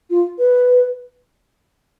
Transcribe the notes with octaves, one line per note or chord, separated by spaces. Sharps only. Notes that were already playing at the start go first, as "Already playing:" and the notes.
F4
B4